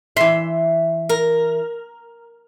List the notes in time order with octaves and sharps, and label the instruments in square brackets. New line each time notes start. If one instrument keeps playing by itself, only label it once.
[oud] E3 E5 [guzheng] C6
[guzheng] A#4